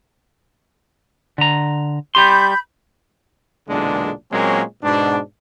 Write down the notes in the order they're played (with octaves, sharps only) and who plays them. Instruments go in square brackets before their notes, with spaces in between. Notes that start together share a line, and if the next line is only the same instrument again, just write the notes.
[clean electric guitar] D3 A#5
[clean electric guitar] G3 G4 C6 [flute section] B5 G6
[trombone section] B1 E2 A#2 D3 G#3 D4
A#2 F#3 G#3 A#3 C4 C#4
G#2 B2 D4